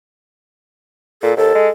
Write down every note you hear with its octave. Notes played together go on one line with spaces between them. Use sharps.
A#2 A4
D#2 A4
G#3